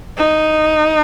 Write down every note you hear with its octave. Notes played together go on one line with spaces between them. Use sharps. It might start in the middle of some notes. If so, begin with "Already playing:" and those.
D#4